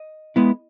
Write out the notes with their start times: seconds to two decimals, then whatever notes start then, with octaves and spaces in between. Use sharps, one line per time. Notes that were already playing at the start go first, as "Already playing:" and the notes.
Already playing: D#5
0.36 G#3 B3 E4